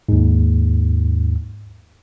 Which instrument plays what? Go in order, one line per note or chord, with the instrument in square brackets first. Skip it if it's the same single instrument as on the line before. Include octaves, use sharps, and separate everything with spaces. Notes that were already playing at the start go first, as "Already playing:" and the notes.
[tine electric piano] D#2 G#2